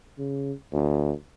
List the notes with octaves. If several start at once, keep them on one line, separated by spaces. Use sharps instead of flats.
C#3
D2